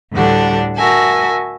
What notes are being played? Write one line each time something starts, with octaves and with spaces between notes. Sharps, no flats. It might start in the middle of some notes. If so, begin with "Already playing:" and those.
D2 A2 D3 G3 D4 F#5
F#4 A#4 E5 G#5 A5